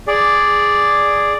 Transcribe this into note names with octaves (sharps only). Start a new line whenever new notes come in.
G#4 D5